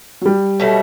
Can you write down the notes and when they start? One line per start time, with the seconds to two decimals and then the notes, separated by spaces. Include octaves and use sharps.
0.22 F#3
0.26 G3
0.60 B2 F#3 A3